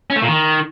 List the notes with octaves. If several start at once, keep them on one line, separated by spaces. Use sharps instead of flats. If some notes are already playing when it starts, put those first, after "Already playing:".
C#4
A3
A#2
D#3